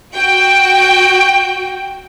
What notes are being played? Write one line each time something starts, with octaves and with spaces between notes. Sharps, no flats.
F#4 G5